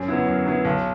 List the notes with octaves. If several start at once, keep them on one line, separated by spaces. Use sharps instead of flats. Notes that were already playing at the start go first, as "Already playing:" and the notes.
Already playing: F#2
F#3 B3 E4
F#2
F#3 B3 E4
B1